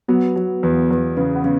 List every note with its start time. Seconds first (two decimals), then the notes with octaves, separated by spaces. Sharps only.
0.08 F#3 B3
0.36 F#3
0.63 E2 B3
0.91 E2
1.17 C#3 B3
1.35 B3
1.44 C#3